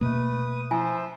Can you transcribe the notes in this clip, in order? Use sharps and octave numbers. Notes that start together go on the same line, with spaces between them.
B2 A3 A#3 B4 D#6
F3 E4 C5 E5 G#5